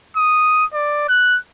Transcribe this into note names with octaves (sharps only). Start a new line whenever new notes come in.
D#6
D5
F#6